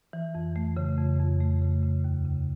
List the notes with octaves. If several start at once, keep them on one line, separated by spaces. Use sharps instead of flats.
E3
F2
A3
C#3
F2
F2
A3
C#3
C#3
D#2
C#3